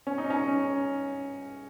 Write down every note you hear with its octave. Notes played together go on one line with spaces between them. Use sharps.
C#4
D#4
C#4